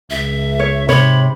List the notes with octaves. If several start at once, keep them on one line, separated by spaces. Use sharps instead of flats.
C#2 E5
C#5
G#2 C3 C#5 B5